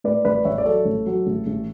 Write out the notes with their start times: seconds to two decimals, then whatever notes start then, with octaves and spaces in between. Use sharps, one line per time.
0.04 A2 B4 D5
0.25 A1 B4 D5
0.45 A1 C#5 E5
0.58 D5
0.65 F#3 A4 C#5
0.85 A1
1.06 F#3
1.27 A1
1.47 A1